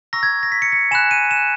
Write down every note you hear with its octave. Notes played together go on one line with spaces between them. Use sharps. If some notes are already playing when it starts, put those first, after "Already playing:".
A#5 C#6 E6 A#6
G#6
A#6
B6
C#7
C#7
G#5 B5 F#6 E7
D#7
E7